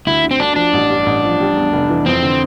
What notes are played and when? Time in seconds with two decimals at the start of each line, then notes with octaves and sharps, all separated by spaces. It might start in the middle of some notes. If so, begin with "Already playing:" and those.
0.06 D2 E4
0.24 D3
0.31 C4
0.40 D2 D4
0.56 F3 D4
0.73 A1
0.90 G2
1.06 A1
1.24 F3
1.40 G3
1.56 E2
1.73 F1
1.90 E3
2.06 F2 C4
2.23 D3